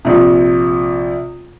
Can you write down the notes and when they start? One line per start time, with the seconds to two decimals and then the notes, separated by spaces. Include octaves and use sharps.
0.05 A#1 C3